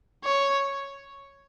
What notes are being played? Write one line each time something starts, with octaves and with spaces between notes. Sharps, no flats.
C#5